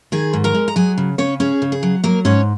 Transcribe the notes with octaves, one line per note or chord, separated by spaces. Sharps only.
D#3 G#4 G#5
G#2
A#4 A#5
G#3
A#5
F#3 G#4 G#5
C#3
C#3 C#4 C#5
C#4 G#4
C#3
G#4
F#3
F#3 A#3 A#4
G#2 C#4 C#5